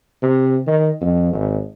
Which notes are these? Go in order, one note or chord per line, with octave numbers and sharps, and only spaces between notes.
C3
D#3
F2
G#1